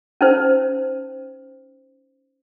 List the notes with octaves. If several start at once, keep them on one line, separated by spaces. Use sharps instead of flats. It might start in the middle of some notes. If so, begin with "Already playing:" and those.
C#4 D#4 C5